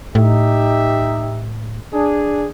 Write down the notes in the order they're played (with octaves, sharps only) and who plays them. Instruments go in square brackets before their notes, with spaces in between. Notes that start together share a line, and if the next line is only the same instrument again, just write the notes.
[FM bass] A2 [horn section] D#4 G4 E5
[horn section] D4 G#4